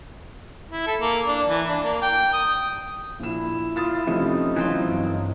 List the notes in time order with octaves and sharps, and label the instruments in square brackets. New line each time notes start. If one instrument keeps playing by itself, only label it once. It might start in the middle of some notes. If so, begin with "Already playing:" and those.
[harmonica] E4
A4
A#3
D4
E3
D4
A#3
G5
D#6
[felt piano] A#1 E7 [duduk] E4
[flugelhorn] F4 [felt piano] D#6 A6 E7
[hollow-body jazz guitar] C3 [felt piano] F3 A3 C#4 [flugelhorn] D#4
[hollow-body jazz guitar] E3 C4 F4 [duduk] F#3
[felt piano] G1